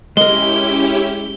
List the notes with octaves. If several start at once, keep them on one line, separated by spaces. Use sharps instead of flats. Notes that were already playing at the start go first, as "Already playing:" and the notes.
G#3 C#4 E4 G4 A#4 G7